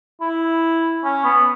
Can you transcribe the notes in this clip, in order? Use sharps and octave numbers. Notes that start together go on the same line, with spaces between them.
E4
C#4
B3